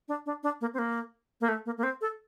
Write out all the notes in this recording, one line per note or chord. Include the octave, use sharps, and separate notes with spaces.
D4
D4
D4
A#3
C4
A#3
A#3
A3
A#3
A#3
C4
A4